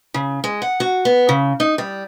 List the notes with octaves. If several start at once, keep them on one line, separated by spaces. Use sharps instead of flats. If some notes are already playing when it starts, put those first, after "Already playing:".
C#3
G#3
F#5
F#4
B3
C#3
D#4
G3